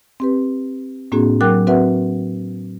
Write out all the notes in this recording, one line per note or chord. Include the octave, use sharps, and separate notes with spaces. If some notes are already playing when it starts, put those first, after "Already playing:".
C4 G4 B4
A2 A#3 C4 D4 F#4 G#4
F#3 A#4 G5 D6 F#6
C4 F#4 B4 E5 F#5